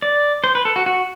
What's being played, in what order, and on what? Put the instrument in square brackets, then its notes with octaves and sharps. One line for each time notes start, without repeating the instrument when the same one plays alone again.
[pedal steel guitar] D5
C5
B4
A4
F#4
F#4